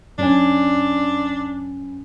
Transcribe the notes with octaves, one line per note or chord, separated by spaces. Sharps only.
F#2 C#4 D4 G#5